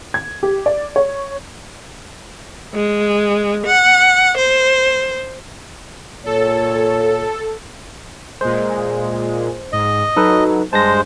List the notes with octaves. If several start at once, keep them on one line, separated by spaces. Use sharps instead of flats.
G#6
G4
D5
C#5
G#3
F#5
C5
A#2 A4 C#5
A#2 G#3 C5
G#2 D#5
F#3 D#4 A4 B4
G2 G#3 C5 A5 A#6